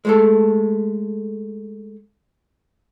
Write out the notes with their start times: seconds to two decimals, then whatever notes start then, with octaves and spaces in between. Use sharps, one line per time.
0.05 G#3 A3 A4